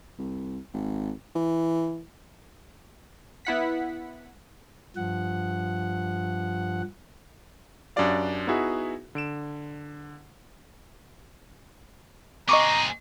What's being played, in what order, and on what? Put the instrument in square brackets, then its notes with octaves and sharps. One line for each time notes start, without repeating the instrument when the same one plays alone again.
[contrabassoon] C2
G#1
E3
[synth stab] B3 E4 F#5 B6
[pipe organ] G2 F3 F#5
[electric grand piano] F#2 D4 F#4 G4 D5 F5
B3 D#4 E4 F#4 G#4 E5
D3 D7 E7
[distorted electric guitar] C4 G#4 [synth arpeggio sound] D#5 C#6 D6 [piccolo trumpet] A#5